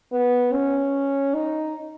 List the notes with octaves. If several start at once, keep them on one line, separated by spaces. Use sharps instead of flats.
B3
C#4
D#4